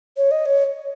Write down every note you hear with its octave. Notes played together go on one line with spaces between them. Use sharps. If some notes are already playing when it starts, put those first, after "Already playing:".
C#5
D#5
C#5